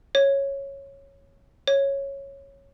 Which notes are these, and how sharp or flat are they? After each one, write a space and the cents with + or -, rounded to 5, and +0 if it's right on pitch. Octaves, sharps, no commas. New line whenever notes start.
C#5 -5
C#5 -5